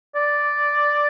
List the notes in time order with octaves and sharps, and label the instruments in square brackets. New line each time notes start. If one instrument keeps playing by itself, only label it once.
[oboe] D5